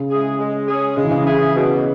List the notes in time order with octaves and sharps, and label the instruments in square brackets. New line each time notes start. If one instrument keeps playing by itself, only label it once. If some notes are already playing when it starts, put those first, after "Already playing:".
Already playing: [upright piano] C#3
[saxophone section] G#3 E4 G#4
G#3
C#4 G#4
[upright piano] C#3 [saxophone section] G#3
[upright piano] E3
C#3
[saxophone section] E4 G#4
B2